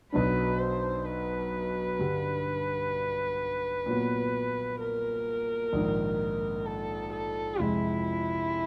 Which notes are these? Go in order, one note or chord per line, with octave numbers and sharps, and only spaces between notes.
B1 B2 F#3 B3 D4 B4
C5
B4
G2 D3 G3
A#2 F#3 B3
A#4
A#1 G#2 D#3
A4
A4
F2 C3 F3 G#3 E4